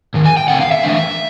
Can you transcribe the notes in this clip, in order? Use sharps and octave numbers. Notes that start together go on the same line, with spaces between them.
G#2 D#3
G#5
G5
E2 C#3 F3 A3 C4 F#5
F5
E5
E3 A3 D4